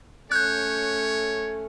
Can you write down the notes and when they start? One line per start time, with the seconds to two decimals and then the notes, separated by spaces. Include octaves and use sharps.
0.32 A3 C#4 C#5 F#6 G6